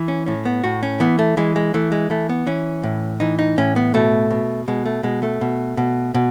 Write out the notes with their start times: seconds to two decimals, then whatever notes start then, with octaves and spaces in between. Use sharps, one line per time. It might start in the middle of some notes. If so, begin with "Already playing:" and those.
Already playing: E3
0.08 C#4
0.26 A2 C#4
0.45 B3
0.64 A2 F#4
0.83 C#4
1.00 E3 B3
1.19 A3
1.37 E3 G#3
1.56 G#3
1.74 E3 A3
1.92 G#3
2.10 E3 A3
2.29 B3
2.47 E3 C#4
2.83 A2
3.20 E3 D#4
3.39 D#4
3.58 A2 C#4
3.76 B3
3.94 B2 A3
4.31 B2
4.68 B2 G#3
4.86 A3
5.03 B2 G#3
5.23 A3
5.41 B2
5.77 B2
6.14 B2